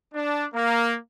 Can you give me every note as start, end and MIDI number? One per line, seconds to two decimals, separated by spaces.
0.14 0.47 62
0.55 0.97 58